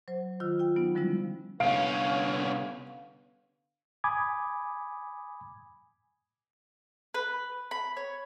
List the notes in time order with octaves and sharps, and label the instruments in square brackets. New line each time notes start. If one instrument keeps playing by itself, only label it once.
[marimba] F#3 C5
D#3 F4 E6
F4 G5
F#3 B3 D#4
D3 F3 G3 G#3 C#4 E4
[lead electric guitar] C2 C#4 [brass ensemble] D3 B3 [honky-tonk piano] F5 D7
[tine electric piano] G#5 B5 D6 D#6 G#6
[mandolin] B4
B5
C#5